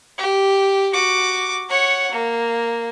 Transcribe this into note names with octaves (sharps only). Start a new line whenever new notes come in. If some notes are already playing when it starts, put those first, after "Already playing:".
G4
F#4 D6
C#5 F#5
A#3